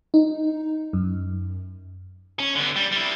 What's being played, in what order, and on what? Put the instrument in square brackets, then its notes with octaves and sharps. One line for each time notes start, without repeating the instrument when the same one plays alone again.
[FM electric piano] D#4
F#2
[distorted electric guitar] C#4
D3 B3
G3
G3 E4